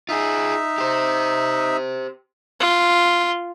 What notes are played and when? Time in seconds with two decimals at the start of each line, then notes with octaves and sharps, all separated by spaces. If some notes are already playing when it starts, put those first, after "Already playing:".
0.09 D#4 F4 G#4 E5
0.78 G4 C5
2.60 F4